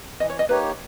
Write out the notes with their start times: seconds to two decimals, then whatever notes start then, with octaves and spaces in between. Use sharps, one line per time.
0.20 E3 D#5
0.30 C#5
0.39 D#5
0.49 A#3 D#4 G4 B4 C#5